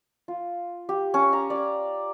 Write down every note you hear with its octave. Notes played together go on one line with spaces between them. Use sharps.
F4
G4
C#4
A#5
D5